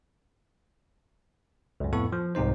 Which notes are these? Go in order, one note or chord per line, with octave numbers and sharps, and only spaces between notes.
C#2 F#2
F2 A2 B3 A4 C#6
F3
C2 G#2 C3 D#4 C5